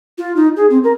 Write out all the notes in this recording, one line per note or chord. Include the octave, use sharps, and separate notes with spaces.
F4
D#4
G#4
C4
A#4